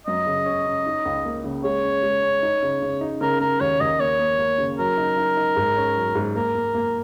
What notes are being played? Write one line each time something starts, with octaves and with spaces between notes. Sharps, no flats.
F#2 D#5
C#3
C#4
C#4
D#4
C#2
A#3
C#3
G#3 C#5
C#4
G#3
C#4
D#4
C#3
C#3
D#4
C#3 A#4
C#3 A#4
D#2 C#5
D#2 D#5
A#3 C#5
A#3
A#3
C#3
F#3 A#4
D#4
D#4
D#4
G#2
C#4
F#3
G#2
A#3 A#4
A#3
A#3